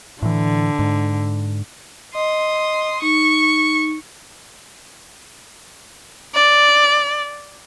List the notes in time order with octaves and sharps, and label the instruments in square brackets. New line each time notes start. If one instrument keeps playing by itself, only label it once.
[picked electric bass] A2 E3 [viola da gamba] D3
[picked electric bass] G#2
[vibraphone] D#5 [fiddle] C6 D#6
[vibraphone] D#4 [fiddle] C#6
[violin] D5